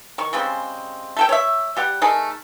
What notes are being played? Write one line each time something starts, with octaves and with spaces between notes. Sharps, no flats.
D#3 C#6
C#3 G3 G#3 C4
A3 A4 G5
C#5 E5
G3 G4 F#5
A3 D#4 G#4 A#4